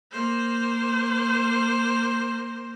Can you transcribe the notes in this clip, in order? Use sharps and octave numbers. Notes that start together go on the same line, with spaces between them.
A#3 C5